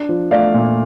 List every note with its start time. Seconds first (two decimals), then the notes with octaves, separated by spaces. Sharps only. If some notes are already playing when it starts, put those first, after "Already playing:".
Already playing: D4
0.09 F3
0.31 A3 D5 F5
0.54 A#2